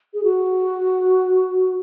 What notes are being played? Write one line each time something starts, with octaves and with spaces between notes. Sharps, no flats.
G#4
F#4